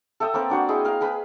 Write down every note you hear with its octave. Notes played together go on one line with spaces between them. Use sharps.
A4 E5 G5 D#6
A#3 C4 A#4 B4
D4 F#4 C5 D5
E4 G#4 D#5 G5
A#4 F5
G#4 B4 B5